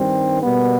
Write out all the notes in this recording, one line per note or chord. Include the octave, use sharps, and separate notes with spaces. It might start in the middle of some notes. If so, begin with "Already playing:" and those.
Already playing: G2 D#3 G3 C4
B2 G3 A#3 B3